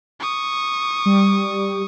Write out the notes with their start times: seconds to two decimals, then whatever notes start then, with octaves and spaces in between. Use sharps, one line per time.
0.20 C#6 D#6
1.06 G3